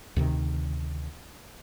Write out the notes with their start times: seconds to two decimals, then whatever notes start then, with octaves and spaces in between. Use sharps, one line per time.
0.16 D2 C3 D#3